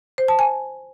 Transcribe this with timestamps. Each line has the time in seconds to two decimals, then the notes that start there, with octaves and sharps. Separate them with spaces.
0.18 C5
0.28 A5
0.39 G#5